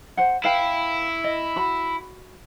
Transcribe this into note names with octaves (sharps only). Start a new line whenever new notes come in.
C5 F#5
E4 B4 F5 G5
D#5
F#4 B5